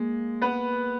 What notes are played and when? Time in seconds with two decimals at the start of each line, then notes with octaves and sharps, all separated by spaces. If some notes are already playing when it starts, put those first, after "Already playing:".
Already playing: G#3 A#3
0.42 B3 B4